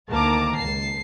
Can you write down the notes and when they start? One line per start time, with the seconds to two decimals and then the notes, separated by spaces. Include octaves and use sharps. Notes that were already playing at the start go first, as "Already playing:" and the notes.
0.10 D2 D#3 A#3 A5 A#5 D6
0.57 C#2 A5 C7